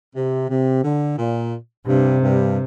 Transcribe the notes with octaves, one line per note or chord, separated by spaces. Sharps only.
C3
C3
D3
A#2
G2 C3
G2